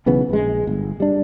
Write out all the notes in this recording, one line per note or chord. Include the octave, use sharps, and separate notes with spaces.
B1 C#3 E3 B3
A#1 G#3
G1
G3 D4